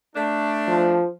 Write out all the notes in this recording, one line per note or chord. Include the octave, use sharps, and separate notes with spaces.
A3 D4
F3